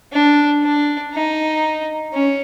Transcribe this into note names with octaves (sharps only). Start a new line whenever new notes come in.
D4
D4
D#4
C#4